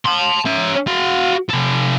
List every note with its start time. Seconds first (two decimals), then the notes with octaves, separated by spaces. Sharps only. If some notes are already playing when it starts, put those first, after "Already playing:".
0.06 A5 C6
0.46 C#4 E5
0.87 F#4 F5
1.50 C3 A4